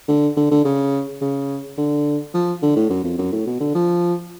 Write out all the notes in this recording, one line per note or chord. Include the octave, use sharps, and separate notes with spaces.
D3
D3
D3
C#3
C#3
D3
F3
D3
A2
F#2
F2
F#2
A2
B2
D3
F3